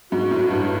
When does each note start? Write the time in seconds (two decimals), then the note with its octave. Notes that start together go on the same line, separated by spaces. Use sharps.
0.12 G#2 F#4
0.31 A2
0.50 G2